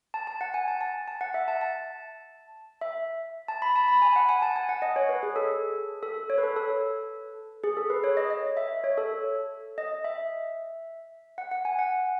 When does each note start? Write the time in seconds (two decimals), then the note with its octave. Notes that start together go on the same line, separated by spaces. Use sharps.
0.14 A5
0.27 A5
0.41 F#5
0.54 G#5
0.68 A5
0.81 A5
1.08 A5
1.21 F#5
1.34 E5
1.48 A5
1.61 A5
2.81 E5
3.48 A5
3.62 B5
3.76 A5
3.88 B5
4.02 G#5
4.16 F#5
4.29 G#5
4.42 A5
4.56 G#5
4.69 F#5
4.82 D#5
4.96 C#5
5.09 B4
5.23 G#4
5.36 A4
6.03 A4
6.30 C#5
6.38 B4
6.43 A4
6.56 A4
7.63 G#4
7.77 A4
7.90 B4
8.04 C#5
8.17 D#5
8.30 D#5
8.57 E5
8.84 C#5
8.97 A4
9.78 D#5
10.04 E5
11.38 F#5
11.51 F#5
11.65 G#5
11.79 F#5